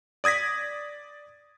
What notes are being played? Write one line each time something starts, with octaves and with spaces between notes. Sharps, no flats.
D5 D#6 G#6 A#6 B6